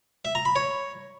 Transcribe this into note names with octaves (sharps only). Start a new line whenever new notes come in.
E5
A#5
B5
C#5